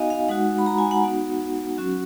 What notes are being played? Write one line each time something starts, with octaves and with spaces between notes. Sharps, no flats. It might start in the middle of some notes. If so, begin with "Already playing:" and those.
Already playing: B3 D#4 F#4 D#5 F5 G#5
F5
G#3 D#4 F#4 F#5
B5
A#5
G#5
F#5
B3 D#4 F#4
F#3 C#4 F#4